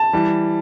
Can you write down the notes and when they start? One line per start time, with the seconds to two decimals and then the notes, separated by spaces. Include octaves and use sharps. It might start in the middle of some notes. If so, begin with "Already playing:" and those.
Already playing: A5
0.13 E3 G3